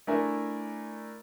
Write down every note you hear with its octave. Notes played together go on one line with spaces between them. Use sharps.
A3 D4 E4 A#4 G#5